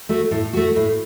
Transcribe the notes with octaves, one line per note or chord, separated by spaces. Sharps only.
A3 F#4
A2
A3 F#4
A2